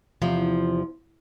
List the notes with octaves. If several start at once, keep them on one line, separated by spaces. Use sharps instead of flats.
E2 C3 F3